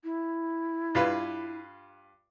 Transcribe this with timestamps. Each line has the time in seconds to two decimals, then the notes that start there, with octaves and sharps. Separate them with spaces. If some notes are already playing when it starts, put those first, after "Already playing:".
0.04 E4
0.95 G2 F4 B4